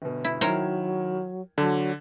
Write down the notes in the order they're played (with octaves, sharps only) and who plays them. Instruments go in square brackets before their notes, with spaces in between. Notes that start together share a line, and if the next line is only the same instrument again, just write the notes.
[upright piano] G1 B2
[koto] E4
[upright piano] D#3 E4 G#6 [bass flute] F#3 [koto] A#4 C5 C#5
[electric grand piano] D3 [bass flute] F#3 [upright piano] A5